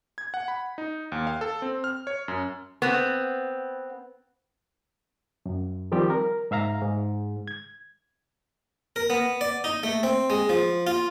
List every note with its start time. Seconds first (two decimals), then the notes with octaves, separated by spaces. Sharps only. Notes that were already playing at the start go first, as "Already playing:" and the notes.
0.18 G#6
0.34 F#5
0.48 B5
0.78 D#4
1.12 D#2
1.27 F5
1.41 A4
1.62 C4
1.84 F6
2.07 C#5
2.28 F#2
2.82 B3 C4
5.46 F#2
5.92 D#3 F3 G3 C4 G4
6.10 A#4
6.51 G#2 E5 F5 A#5
6.82 G#2
7.48 G#6
8.96 A#4
9.10 B3
9.41 D5
9.64 D#4
9.83 A3
10.03 C4
10.30 G#3
10.49 F3
10.87 F4